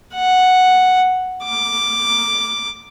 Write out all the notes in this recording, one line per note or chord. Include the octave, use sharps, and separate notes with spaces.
F#5
D6